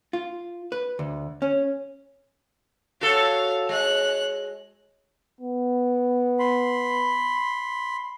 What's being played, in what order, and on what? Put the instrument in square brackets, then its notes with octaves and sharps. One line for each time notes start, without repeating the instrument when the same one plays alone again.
[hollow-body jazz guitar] F4
B4
D2
C#4
[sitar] F#4 A4 [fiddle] C#5 F5
[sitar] G#3 [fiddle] C#5 F#6
[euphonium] B3
[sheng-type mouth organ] B5 C6